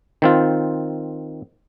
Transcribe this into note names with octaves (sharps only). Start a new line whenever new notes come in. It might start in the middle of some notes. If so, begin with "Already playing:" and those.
D#3 C4 F4